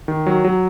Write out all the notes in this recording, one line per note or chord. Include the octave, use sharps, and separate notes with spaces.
D#3
F#3
F#3